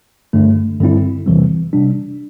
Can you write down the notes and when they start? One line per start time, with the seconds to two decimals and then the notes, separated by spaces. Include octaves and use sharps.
0.33 G2 D3 A3
0.80 G2 D3 G3 C4 E4
1.26 E2 C3 E3 G3 C4
1.73 C3 G3 D4